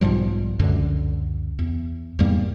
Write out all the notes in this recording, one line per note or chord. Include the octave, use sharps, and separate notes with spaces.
B1 G#2 F3 G3
C#2 F#2 D3
E2
E2 G#2 G3 A#3